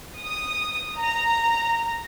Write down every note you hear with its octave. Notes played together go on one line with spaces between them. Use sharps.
D#6
A#5